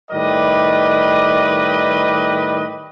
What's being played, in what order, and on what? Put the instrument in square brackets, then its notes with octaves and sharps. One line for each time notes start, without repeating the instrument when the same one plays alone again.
[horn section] A2 D#3 G3 B4 D5 D#5